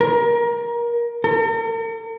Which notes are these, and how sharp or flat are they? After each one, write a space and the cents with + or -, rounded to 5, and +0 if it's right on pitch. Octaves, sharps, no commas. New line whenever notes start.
A#4 +25
A#4 -45